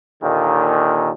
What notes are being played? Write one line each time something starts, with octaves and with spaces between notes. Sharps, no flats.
D#2 A#2 D3 D#3